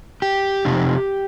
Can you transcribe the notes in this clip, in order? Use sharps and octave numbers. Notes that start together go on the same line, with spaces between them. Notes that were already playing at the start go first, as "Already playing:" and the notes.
G4
F2 C3 D#4